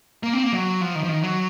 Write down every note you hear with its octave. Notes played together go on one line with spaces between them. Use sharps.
A#3
C4
A#3
F#3
F3
D#3
F3
D#3
F#3